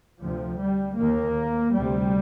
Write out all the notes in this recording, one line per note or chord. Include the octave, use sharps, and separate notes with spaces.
D2 C3 F3
G3
D#2 A#3
D2 C3 G3